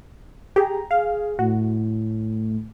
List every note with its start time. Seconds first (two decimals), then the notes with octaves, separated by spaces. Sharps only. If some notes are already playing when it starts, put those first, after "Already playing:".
0.56 G4 G#4 A#5
0.91 G#4 F5
1.39 A2 F#4